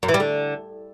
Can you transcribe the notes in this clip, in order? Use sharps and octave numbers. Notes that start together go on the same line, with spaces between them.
F#2
E3
G3
D3